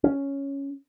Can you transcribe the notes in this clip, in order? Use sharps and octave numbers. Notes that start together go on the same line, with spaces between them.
C#4